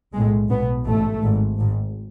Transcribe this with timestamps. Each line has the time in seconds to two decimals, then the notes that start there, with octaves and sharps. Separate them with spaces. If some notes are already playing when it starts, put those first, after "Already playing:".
0.14 B1 A2 G#3
0.50 B1 B2 B3
0.85 A1 G#2 A3
1.22 G#1 G#2
1.58 G#1 G#2